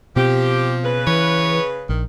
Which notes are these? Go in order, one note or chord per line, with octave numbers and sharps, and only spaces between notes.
B2 F3 C4 G4
C#3 B4
E3 C#5
A#1 D#3